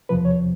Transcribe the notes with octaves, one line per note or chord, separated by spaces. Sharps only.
E2 C3 F3 B4
C#5